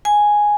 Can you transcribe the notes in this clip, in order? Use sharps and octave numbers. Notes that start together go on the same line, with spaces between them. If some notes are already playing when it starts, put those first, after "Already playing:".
G#5